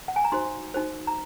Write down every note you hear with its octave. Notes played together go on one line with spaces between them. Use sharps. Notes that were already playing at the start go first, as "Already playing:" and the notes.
F#5
G#5
A#5
D#4 F#4 C5 C6
D#4 F#4 C5
A#5